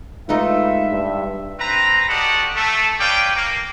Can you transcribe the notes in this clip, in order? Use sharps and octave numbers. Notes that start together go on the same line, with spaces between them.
G#2 A3 D#4 F4 B4 E5
G2
C4 B4 A#5
F#4 G4 A4 D5 D#5 F#5
A3 A4
B4 C#5 D5 F5 G5
A#3